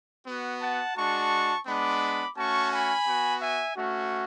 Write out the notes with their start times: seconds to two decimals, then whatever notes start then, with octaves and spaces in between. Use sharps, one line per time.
0.26 B3 F#4
0.61 F#5 A5
0.96 G#3 D4 F#4 A5 C#6
1.66 G#3 B3 D4 B5 D6
2.37 A3 C#4 F#4 A5 C#6
2.72 G#5 B5
3.06 B3 F#4
3.41 E5 G#5
3.76 A3 C#4 F#4